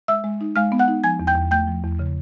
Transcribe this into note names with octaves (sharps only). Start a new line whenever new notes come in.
G#3 E5 E6
G#3
D#4
G#3 F5 F6
B3
F#5 F#6
D#4
F3 G#5 G#6
E2
G5 G6
E2
A3 G5 G6
F3
E2
C#3